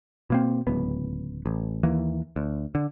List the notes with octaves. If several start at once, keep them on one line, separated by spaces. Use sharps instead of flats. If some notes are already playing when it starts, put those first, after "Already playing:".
B2 A#3 C4
D1 C#2 B3
A1
D#2 E3 A#3
D2
D3